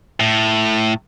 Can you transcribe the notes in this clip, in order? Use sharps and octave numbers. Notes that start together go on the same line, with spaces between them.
A2